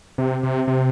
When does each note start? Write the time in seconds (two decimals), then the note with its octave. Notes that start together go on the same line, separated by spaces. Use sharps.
0.18 C3
0.43 C3
0.67 C3